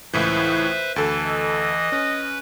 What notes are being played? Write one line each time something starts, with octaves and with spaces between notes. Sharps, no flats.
C#2 A2 E3 B4 C5 E5
D2 E3 A4
D#5
C#4 B4